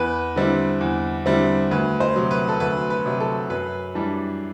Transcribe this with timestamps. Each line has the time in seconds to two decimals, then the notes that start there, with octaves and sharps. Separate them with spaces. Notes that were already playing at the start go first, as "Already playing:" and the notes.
Already playing: E2 B4
0.36 D3 G3 C4 E4
0.81 E2
1.26 D3 G3 C4 E4
1.71 D2 B4
2.00 C5
2.16 C3 F#3
2.31 B4
2.49 A4
2.60 D2 B4
2.90 B4
3.06 C3 F#3
3.20 A4
3.50 F#2 B4
3.95 E3 G3 D4